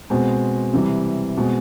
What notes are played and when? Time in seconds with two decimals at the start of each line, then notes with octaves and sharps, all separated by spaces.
0.10 B2 G#3 C4
0.73 C3 E3 G3
1.37 B2 G#3 C4